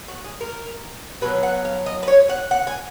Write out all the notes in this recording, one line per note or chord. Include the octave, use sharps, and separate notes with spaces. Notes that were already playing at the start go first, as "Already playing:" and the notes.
F#4
G#4
A#4
B2 F#3 C#4 B4
F#5
F5
D#5
B4
C#5
F#5
F#5
G#5